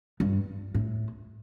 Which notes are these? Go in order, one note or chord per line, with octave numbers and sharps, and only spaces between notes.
G2
A2